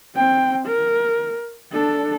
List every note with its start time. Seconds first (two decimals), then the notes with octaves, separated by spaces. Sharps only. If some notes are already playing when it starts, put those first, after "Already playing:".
0.16 C4 G5
0.66 A#4
1.72 D4 A4